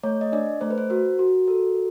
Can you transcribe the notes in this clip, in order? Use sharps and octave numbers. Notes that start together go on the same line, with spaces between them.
A3 C#5
D#5
D4 D5
A3 C5
B4
C5
F#4 A#4
F#4 A#4
A4 A#4